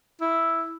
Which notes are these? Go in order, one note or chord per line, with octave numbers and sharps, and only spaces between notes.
E4